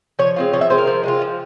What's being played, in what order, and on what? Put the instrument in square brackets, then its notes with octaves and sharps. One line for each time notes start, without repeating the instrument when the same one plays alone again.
[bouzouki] F3 C#5
G#3 C4 F4
F3 C#5
E5
G#3 C4 F4 C5
A#4
F3
G#3 C4 F4
F3